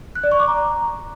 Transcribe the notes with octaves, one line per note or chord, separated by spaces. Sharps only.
F#6
D5
C#6
D6
A#5